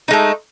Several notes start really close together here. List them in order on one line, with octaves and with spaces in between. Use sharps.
D#4 G#3 A3